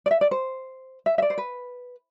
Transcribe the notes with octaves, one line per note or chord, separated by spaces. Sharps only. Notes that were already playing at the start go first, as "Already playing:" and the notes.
D5
E5
D5
C5
E5
E5
D5
C5
B4